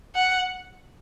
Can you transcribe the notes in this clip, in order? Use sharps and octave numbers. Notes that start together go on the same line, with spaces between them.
F#5